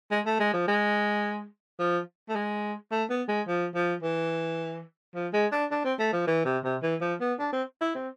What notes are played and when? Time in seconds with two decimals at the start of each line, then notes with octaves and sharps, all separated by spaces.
0.11 G#3
0.25 A3
0.40 G#3
0.53 F3
0.68 G#3
1.79 F3
2.28 A3
2.35 G#3
2.91 A3
3.10 B3
3.28 G#3
3.47 F3
3.75 F3
4.02 E3
5.15 F3
5.33 G#3
5.52 D4
5.71 D4
5.85 C4
5.99 A3
6.13 F3
6.27 E3
6.45 C3
6.64 C3
6.82 E3
7.01 F3
7.21 B3
7.39 D4
7.53 C4
7.81 E4
7.95 C4